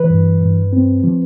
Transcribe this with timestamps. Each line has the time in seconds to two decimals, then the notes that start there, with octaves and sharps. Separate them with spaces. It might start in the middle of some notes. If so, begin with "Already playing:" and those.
Already playing: E3 B4
0.10 G2
0.40 G2
0.73 C4
1.04 F3